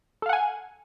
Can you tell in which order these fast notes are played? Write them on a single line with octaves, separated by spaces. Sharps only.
A4 F5 F#5 G#5